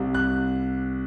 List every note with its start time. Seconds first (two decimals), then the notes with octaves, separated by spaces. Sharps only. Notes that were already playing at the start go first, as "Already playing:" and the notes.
Already playing: C2 C3 G3
0.14 F#6